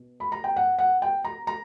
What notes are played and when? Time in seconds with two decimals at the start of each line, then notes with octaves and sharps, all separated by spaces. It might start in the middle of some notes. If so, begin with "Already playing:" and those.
Already playing: B2
0.20 B5
0.32 A#5
0.44 G5
0.56 F#5
0.79 F#5
1.02 G5
1.24 A#5
1.47 A#5